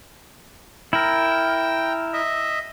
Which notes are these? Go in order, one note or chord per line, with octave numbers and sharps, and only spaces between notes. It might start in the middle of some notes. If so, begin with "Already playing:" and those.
E4 A#4 G5
D#5 E5